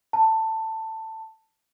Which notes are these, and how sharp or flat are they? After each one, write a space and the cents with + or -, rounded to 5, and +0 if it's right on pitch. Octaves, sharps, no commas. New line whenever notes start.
A5 +15